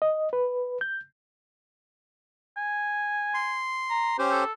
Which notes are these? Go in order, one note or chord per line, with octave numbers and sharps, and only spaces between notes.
D#5
B4
G6
G#5
C6
A#5
C#4 G4 C5 G5
A4